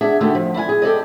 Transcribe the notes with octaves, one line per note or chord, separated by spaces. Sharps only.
D4 G#4 E5 F#5
D3 D#3 A3 F#4 G4
F3
E4 D5 F5 G#5
G#4
G4 A4 D5 D#5